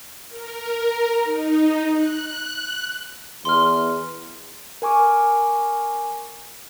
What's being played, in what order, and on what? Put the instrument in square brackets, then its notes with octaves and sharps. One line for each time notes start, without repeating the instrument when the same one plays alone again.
[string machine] A#4
D#4
F#6
[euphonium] E2 [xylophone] C6 F6
[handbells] A#4 G#5 C#6 D6